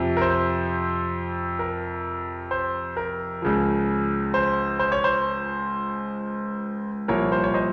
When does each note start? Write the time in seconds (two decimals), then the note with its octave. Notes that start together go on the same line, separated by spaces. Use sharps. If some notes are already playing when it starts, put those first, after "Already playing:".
Already playing: F2 C3 F3
0.17 A#4
0.22 C5
1.59 A#4
2.51 C5
2.97 A#4
3.42 C#2 C#3 F3
4.34 C5
4.79 C5
4.92 C#5
5.04 C5
7.08 C2 A#2 F3 A#4 C#5
7.32 C5
7.44 C#5
7.54 C5 D#5